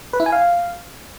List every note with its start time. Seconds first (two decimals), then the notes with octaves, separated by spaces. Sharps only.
0.13 B4
0.20 E4
0.26 G#5
0.32 F5